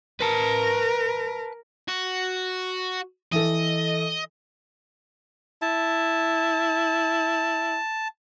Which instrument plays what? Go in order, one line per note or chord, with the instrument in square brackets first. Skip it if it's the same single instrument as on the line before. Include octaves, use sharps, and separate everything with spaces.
[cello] A#4 [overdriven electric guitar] B4 A5
[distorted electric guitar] F#4
[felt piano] E3 A4 [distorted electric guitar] D#5
[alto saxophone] E4 [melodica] A5